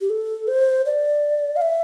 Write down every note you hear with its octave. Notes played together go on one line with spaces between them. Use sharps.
G4
A4
C5
D5
F5
E5